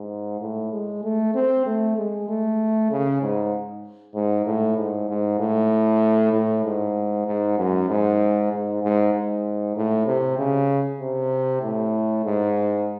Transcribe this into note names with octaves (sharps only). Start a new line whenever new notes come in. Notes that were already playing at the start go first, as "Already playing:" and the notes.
Already playing: G#2
A2
G#3
A3
C4
A3
G#3
A3
C#3
G#2
G#2
A2
G#2
G#2
A2
A2
G#2
G#2
F#2
G#2
G#2
G#2
G#2
A2
C3
C#3
C3
A2
G#2